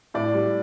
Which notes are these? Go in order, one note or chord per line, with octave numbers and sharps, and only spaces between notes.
A2 D5
G3